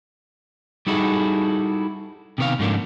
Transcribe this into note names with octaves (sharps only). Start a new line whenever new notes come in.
G3 D#4 E4 F#4 G#4 A4
C3 D#3 B3 G4 C#5 F5
G#2 F3 A3 A#3 C#4 D4